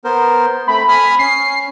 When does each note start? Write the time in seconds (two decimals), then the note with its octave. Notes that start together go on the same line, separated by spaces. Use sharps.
0.04 B3 A#4 C5
0.68 A3 C4 B5
0.89 G#5 D#6 F6
1.19 C#4 C7